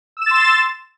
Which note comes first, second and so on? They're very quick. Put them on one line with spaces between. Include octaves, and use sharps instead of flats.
E6 E7 A6 C6